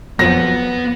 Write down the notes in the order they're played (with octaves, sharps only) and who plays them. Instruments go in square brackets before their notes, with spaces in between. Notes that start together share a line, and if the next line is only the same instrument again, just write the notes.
[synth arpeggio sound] F2 F3 F#3 [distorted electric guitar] B3 [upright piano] A#6